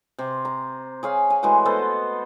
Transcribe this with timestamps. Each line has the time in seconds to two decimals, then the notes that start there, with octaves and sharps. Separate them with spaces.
0.19 C3
0.45 A#5
1.03 G#4 C#5 F5
1.30 G#5
1.43 E3 G#3 A3 F#4
1.65 B3 A4 C5 D#5